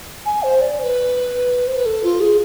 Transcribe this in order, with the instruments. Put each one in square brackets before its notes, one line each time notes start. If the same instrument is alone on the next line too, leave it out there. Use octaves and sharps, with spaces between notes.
[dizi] G#5
C5
D5
C5
B4
C5
B4
A4
F4
G#4